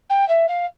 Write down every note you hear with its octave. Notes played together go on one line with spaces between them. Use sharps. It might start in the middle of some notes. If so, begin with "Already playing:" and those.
G5
E5
F5